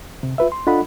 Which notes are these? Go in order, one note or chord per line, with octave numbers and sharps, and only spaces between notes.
C3
F4 B4 E5
C6
D4 F4 A4 D#5 F#5 B5